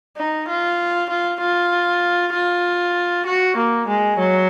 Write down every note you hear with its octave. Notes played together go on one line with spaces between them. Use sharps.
D#4
F4
F4
F4
F4
F#4
A#3
G#3
F#3